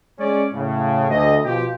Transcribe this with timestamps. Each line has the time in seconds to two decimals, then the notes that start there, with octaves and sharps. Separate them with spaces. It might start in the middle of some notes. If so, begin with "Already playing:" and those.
0.19 G#3 C#4 D5
0.53 A2 C#3
1.10 D2 D#5
1.45 B2 F3 F4 G4